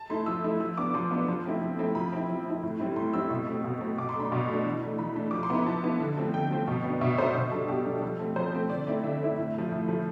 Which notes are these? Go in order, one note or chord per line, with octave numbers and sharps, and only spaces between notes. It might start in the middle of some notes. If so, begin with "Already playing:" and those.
Already playing: A5
A3 E4 C6
F3 E6
A3 E4
F3 E6
B3 D4 D6
F3 C6
B3 D4
F3 C6
A3 C4 E4
F3
A3 C4 E4
F3 B5
C4 E4
F3
C4 E4
A2
G3 C4 E4
A2 C6
G3 C4 E4 E6
B2
A3 C4
B2
A3 C4
B2 D6
C6
A3 D4 B5
B2
A3
D4
E3
A3 D4
E3 B5
A3 D4
F3 D6
C6
B3 E4 B5
F3 A5
B3 E4
D3
F3 A3 C4
D3 G5
F3 A3 C4
B2
B3 D4
B2 E5
B3 D4 C5
B2
G3 D4 A4
B2 G4
G3 D4
F3 A4
A3 C4
F3 C5
A3 C4
D3 D5
A3 C4 E4
D3 E5
A3 C4 E4
A2
F3 A3
A2
F3 A3